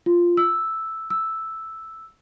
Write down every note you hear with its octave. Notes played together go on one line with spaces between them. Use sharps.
F4
E6
E6